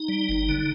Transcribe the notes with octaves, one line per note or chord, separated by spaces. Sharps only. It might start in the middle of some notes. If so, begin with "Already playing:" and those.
Already playing: D#4
G3
G1
D3